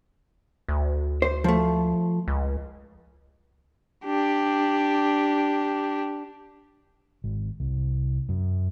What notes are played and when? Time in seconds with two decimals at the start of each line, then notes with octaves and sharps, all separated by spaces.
0.68 D2
1.22 C5
1.44 F3 A3
2.28 C#2
4.05 D4 G4
7.24 G#1
7.60 C2
8.29 F#2